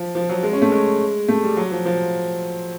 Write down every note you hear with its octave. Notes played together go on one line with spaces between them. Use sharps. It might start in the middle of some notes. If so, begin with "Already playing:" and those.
Already playing: F3
F3
F#3
G#3
C#4
A3
G#3
A3
G3
F#3
F3
F3